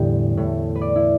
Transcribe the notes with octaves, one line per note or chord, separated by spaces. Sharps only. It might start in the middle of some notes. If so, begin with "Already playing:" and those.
Already playing: E2 A2 D3 G3 B3 G5
A2 A3
B4
D5
E4